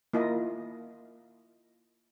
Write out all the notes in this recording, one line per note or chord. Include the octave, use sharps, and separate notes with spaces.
A#3 E4 F4 D#5